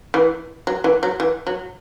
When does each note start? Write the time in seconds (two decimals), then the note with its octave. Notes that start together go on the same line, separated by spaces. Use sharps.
0.14 E3
0.67 F#3
0.84 E3
1.03 F#3
1.20 E3
1.47 F#3